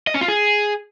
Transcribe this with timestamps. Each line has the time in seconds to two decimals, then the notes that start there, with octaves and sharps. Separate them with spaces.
0.07 D#5
0.14 C#4
0.21 F4
0.28 G#4